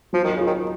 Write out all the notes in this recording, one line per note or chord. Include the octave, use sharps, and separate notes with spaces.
F3 F#3
D#3
C#3 F4
D#3